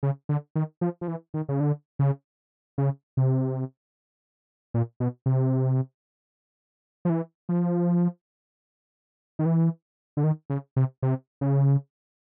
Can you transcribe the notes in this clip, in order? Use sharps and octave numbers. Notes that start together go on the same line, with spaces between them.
C#3
D3
D#3
F3
F3
E3
D#3
C#3
D3
C#3
C#3
C3
A#2
B2
C3
F3
E3
F3
D#3
E3
D3
D#3
C#3
C3
C3
C#3